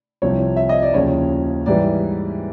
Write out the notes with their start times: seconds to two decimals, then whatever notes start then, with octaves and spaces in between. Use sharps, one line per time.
0.22 C2 C3 F3 C#5
0.57 E5
0.69 D#5
0.82 D5
0.93 D#2 C#3 F3 C#5
1.66 G#2 E3 G3 D5